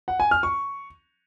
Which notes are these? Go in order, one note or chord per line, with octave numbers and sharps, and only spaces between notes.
F#5
G#5
F6
C#6